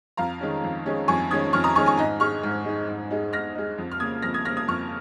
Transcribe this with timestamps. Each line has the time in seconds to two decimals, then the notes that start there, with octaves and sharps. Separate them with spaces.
0.17 F2 F5 A#5
0.40 D#3 G#3 C#4
0.64 F2
0.86 D#3 G#3 C#4
1.08 F2 G#5 C#6
1.30 D#3 G#3 C#4 D#6 G#6
1.53 F2 C#6 F6
1.64 A#5 D#6
1.75 D#3 G#3 C#4 G#5 C#6
1.86 G#5 C#6
1.97 G#2 D#5 G#5
2.20 G#3 D#4 C#6 F6
2.43 G#2
2.65 G#3 D#4
2.89 G#2
3.11 G#3 D#4
3.33 G#2 F6 A#6
3.55 G#3 D#4
3.78 F2
3.92 F6
4.00 C#3 A#3 D#6 G#6
4.22 F2 F6 A#6
4.34 D#6 G#6
4.45 C#3 A#3 F6 A#6
4.57 D#6 G#6
4.68 F2 C#6 F6